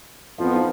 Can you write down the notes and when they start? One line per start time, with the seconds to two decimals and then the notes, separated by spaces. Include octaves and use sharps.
0.38 F2 F3 B3 F4
0.55 D#4